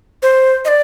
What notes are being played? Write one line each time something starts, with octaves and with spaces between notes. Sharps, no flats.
C5
D#5
D5